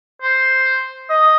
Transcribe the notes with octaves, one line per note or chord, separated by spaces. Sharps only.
C5
D#5